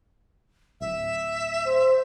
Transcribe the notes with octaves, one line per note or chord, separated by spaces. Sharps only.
D1 E5
C5